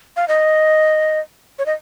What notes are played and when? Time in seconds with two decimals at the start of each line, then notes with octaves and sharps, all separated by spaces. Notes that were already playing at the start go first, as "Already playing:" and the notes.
0.17 F5
0.28 D#5
1.59 C#5
1.66 D#5